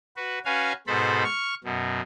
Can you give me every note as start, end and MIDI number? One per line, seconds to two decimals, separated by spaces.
0.16 0.39 66
0.16 0.39 71
0.45 0.73 61
0.45 0.73 66
0.45 0.73 71
0.45 0.73 77
0.45 0.73 80
0.87 1.23 44
0.87 1.23 47
0.87 1.23 69
0.87 1.23 72
0.87 1.23 83
1.24 1.54 85
1.24 1.54 89
1.64 2.01 42
1.64 2.01 47